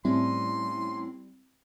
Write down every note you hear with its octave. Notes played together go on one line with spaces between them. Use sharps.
A2 G3 C4 C#4 E4 A5 C6